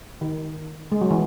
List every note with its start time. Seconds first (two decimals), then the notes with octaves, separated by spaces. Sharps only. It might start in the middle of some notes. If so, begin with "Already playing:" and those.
0.21 D#3
0.92 G#3
1.01 F#3
1.11 E3